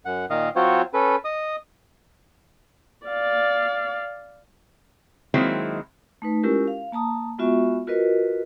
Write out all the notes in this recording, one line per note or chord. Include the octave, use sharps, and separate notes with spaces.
F#2 F#5
A#2 D#3 D#5 F5
F#3 C4 F4 F#4 C5 C#5
C#4 A4 B4
D#5 D#6
D5 F5
D#3 F#3 G#3 A#3 C4 E4
A3 D#4 B4
G#3 C#4 E4 F4 G4 A#4
F5
A#3 A5 A#5 D#6
G#3 B3 F4 F#4 E5 C#6
F4 F#4 A#4 B4 D#5